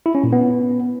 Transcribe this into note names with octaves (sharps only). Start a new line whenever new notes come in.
E4
C#4
A#2
B3